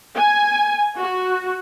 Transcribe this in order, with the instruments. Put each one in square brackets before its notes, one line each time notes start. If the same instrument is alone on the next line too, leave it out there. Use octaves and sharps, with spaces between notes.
[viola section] G#5
F#4